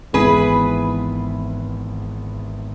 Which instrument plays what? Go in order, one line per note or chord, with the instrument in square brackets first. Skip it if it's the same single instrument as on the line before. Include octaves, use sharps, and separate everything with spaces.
[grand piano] G#1 G#2 E3 B3 E4 [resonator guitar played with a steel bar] G#4 B4